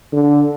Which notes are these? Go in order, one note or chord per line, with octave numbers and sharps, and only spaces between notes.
D3